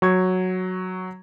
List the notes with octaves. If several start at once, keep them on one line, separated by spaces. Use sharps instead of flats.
F#3 C#6 G#6